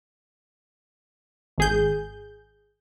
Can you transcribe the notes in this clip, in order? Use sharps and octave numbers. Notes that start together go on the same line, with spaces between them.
G#1 G#4 G6